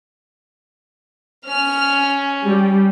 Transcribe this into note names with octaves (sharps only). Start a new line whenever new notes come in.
C#4 F6
G3